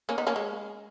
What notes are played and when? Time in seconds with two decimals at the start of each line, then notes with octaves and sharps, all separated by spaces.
0.09 A#3 C#4
0.18 B3 D#4
0.27 A#3 C#4
0.36 G#3